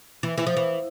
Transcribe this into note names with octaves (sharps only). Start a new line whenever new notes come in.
E3
E3
F3
E3